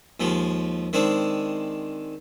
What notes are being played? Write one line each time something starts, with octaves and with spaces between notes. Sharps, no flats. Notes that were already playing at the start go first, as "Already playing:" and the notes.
D#2 F3 G#3
D#3 G#3 C4 D4